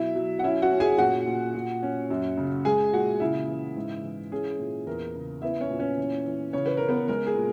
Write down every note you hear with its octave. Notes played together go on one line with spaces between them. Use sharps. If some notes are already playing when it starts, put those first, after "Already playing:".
Already playing: B2 F#3 E4 E5
F#3
F#5
C#4 E4 E5
F#4 F#5
C#4
G#4 G#5
A#2 F#4 F#5
A#2
A#2
C#4
F#2
C#3
G#3 G#4 G#5
A#2 F#4 F#5
C#3 E4 E5
E3
G#2
E3
C#4 G#4
A#2
E2 A#4
C#3
B3 E4 E5
C#4 C#5
A#2
C#4 C#5
E3
E3
C#3 C#5
B4
C#3 A#4
B3 B4
G#3 A#4
G#4
A#2